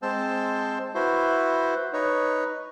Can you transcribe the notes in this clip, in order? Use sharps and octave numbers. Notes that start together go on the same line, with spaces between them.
G#3 C4 C5 A5 E6
E4 F#4 B4 C5
D#4 B4 C#5